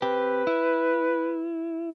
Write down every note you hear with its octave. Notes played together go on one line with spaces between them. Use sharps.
C4 G4 B4
E4